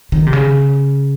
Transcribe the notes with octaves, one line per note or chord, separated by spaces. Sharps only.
D#3
C3
C#3